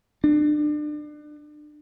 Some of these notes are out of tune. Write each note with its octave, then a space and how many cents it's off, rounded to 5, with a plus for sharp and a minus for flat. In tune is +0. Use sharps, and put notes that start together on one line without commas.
D4 +30